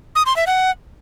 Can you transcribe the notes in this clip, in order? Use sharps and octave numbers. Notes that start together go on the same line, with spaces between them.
D#6
C6
E5
F#5